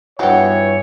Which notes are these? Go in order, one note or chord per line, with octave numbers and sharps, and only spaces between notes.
G2 E3 F3 B3 E4 F#4 C#5 G5